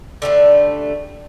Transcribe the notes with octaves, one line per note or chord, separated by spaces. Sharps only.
D3 G3 A3